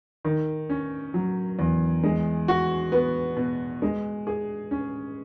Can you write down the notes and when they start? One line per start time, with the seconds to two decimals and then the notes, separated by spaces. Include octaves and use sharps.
0.25 D#3
0.70 C#4
1.14 F#3
1.59 E2
2.03 G#3
2.48 F#4
2.92 B3
3.36 B2
3.82 G#3
4.27 G#4
4.71 C#4